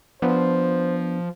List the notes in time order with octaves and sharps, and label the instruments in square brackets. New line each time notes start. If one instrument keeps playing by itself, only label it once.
[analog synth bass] F3 [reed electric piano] B3 D4 [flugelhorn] C5